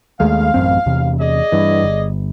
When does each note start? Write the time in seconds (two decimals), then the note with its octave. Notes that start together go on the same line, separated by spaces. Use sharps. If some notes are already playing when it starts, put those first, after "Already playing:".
0.20 D#2 G#3 A3 F5
0.54 A1 F#2 C4
0.86 E2 C3
1.20 G#4 D5 D#5
1.52 G2 E3
1.84 G1